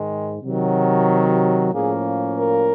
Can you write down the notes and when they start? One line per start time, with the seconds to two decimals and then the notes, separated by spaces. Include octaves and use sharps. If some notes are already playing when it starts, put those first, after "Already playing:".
Already playing: G#2 D#3 G#3
0.43 C3 D#3 F#3
1.08 G4
1.72 A2 F3 A#3 C#4 G#4
2.39 A#4